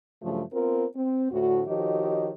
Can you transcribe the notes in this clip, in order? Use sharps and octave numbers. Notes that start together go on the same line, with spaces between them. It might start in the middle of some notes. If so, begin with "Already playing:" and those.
G2 C#3 F3 F#3 A3
B3 C4 F4 A#4
C4
D2 A2 F#4
D#3 F3 F#4 G4 C#5 D#5